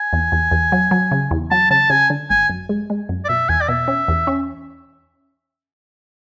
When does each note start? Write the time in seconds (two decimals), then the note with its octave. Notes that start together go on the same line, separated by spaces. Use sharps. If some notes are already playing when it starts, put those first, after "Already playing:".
Already playing: G#5
0.13 E2
0.32 E2
0.52 E2
0.72 F#3
0.91 F#3
1.11 C#3
1.31 E2
1.51 F#3 A5
1.71 C#3 A5
1.90 C#3 G#5
2.10 D3
2.30 G#1 G#5
2.50 F#2
2.69 G#3
2.90 G#3
3.09 F#2
3.24 D5
3.29 B2 E5
3.49 E2 G#5
3.61 D5
3.69 B2 E5
3.88 C#4
4.08 E2
4.27 C#4